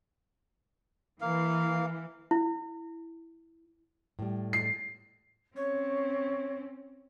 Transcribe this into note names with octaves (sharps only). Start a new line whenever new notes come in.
E3 A#3 F5
E4
A2 G3
C7
C4 C#4 C#5